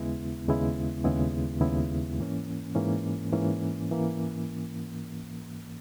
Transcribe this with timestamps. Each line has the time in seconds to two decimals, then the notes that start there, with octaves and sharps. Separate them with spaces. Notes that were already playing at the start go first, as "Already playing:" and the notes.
Already playing: D#2 C#3 G#3 B3 E4
0.47 D#2 C#3 G#3 B3 E4
1.04 D#2 C#3 G#3 B3 E4
1.61 D#2 C#3 G#3 B3 E4
2.19 G#2 E3 A#3 C#4
2.75 G#2 E3 A#3 C#4
3.32 G#2 E3 A#3 C#4
3.92 E3 A#3